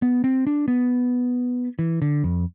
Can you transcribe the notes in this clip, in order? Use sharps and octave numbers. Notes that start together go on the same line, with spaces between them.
B3
C4
D4
B3
E3
D3
F2